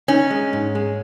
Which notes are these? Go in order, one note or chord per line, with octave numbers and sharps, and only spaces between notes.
C#4 D#4
G#3
G#2
G#3